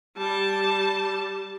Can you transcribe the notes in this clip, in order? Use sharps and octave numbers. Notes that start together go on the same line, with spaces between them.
G3 A5